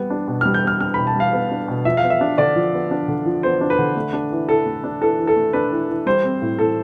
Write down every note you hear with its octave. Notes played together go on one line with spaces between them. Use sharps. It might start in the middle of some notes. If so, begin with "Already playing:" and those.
Already playing: G3 B3
D4
B2
G3 F6
G6
B3 F6
D4 F6
B2 B5
A5
G3 F5
B3
D4
B2
F3 E5
F5
B3
E5
D4
D3 D5
F3
B3
D4
D3
F3
B3 C5
D4
B4
D3
A3
D4
E3
E3 A4
A3
D4
E3 A4
E3
A4
A3
D4 B4
E3
E3
G3 C5
C4
A2
A2 A4